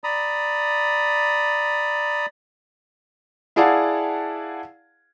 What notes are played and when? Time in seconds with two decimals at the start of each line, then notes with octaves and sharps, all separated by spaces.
0.04 D5 A#5 B5 D#6
3.56 E4 G#4 D5 F5 F#5 A5